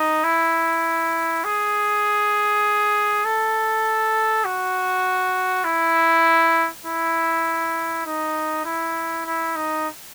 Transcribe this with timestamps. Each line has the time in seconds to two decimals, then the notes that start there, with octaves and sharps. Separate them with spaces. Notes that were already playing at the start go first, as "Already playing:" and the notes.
Already playing: D#4
0.24 E4
1.44 G#4
3.25 A4
4.44 F#4
5.65 E4
6.86 E4
8.06 D#4
8.65 E4
9.26 E4
9.56 D#4